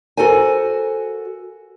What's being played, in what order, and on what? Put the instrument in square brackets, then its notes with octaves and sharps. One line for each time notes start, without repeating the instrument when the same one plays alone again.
[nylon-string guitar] F#4 A4 A#4 C5 G#5